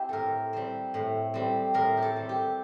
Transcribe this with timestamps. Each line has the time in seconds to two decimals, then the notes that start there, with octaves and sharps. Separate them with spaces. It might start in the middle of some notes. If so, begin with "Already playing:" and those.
Already playing: C4 E4 G4
0.09 A2 A4 A#4
0.53 G3 C4
0.94 A2
1.34 G3 C4
1.74 A2 A#4
1.97 G4
2.02 A4
2.16 G3 C4
2.29 G4